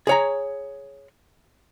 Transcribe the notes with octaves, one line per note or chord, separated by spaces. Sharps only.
G#4 C#5 A#5